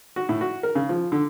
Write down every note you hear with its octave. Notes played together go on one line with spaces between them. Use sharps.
F#4
A2
F#4
A#4
C#3
F3
D3